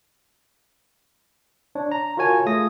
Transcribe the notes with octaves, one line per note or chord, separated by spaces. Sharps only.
D4 C#5
A#5
F4 F#4 A#4 C#5 G#5 A5
A3 F4 G#4 D#6 A#6